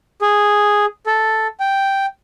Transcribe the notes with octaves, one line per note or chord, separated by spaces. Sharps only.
G#4
A4
G5